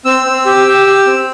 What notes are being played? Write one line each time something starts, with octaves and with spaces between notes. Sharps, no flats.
C4 E6
C4
G4
G4
G4
C4